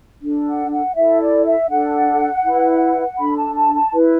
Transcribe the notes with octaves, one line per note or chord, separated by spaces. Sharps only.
D4 A4
F#5
F#5
E4 A4 E5
D5
E5
D4 A4 F#5
E4 B4
D4 A4 B5
A5
A5
A5
E4 B4